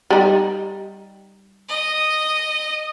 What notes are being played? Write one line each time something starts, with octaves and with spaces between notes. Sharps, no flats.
G3 D#4
D#5